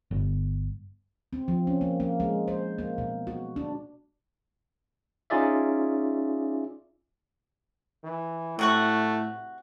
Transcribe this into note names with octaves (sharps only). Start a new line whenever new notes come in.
G1
C4
F3
C#4
A#3
A#3
G#3
C5
A#3
B2
F#4
D4
C#4 D#4 F4 G#4 D5 E5
E3
A2 C3 A3 F#4 C#6